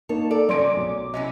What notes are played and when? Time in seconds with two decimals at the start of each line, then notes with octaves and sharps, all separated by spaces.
0.09 A#3 D#4 A#4 C#5 A5
0.31 A4 D5
0.49 C3 D#3 F#3 C#4 D5 C6 D7
0.63 D6
0.76 B1
1.14 C3 C#4 E4 D#5